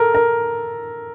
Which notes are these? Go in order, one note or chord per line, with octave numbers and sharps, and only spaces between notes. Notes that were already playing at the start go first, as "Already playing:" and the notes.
Already playing: A4 A#4
A#4